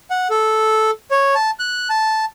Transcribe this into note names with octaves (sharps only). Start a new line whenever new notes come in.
F#5
A4
C#5
A5
F#6
A5